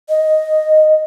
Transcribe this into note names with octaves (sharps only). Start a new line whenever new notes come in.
D#5